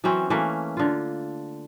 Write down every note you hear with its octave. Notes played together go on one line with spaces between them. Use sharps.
E3 F#3 C4 C#4
E3 A3 A#3 C#4
D3 F4